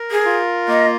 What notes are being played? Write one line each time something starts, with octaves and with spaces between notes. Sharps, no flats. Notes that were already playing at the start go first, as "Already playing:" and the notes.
Already playing: A#4
G#4
F4
A#3 D#5